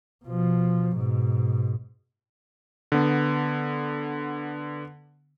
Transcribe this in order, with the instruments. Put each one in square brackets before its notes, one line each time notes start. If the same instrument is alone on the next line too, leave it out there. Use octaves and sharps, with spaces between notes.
[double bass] B2 F3
G#2 B2
[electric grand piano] D3 B3